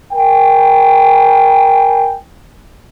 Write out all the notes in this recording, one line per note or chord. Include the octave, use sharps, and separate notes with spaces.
A#4 G5 G#5